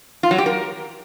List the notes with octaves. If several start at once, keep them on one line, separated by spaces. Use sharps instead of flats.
F4
F#3
G4
A#4